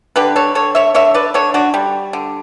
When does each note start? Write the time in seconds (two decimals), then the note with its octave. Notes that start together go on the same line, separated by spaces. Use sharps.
0.16 D3 G4 B4
0.36 A4 C#5
0.55 D3 A4 C#5
0.75 C#5 E5
0.94 D3 C#5 E5
1.14 B4 D5
1.34 D3 A4 C#5
1.54 D4 F#4
1.74 G3
2.13 D3